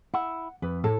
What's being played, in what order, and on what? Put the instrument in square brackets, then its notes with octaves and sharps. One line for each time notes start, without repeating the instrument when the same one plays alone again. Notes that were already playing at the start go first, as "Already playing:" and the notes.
[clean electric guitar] E4 [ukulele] F#5
[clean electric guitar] F2 [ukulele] B4
[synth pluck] A2 [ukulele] A4